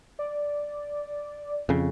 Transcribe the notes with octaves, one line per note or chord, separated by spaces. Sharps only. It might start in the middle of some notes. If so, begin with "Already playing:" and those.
D5
F2 C#3